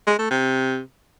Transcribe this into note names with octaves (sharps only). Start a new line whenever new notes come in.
G#3
A3
C3